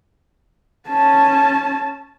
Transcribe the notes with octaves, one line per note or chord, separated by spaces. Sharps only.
C#4 A5